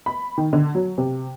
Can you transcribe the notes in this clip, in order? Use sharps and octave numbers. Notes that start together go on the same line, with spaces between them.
B5
D#3
D3
F#3
C3